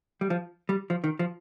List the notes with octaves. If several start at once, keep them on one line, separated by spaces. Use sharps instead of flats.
G3
F3
G3
F3
D#3
F3